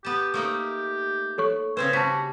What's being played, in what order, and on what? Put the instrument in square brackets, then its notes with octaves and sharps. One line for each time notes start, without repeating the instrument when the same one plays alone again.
[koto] B3 A5 [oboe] G4
[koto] A3 A#3 D#4
[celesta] A4 C#5 C#6
[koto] C#3 C4 C5 [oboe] G#4 [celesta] B4
[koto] C#3 G3 [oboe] F#4 [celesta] A5 B6